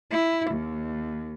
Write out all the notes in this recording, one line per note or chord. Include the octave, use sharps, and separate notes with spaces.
E4
D#2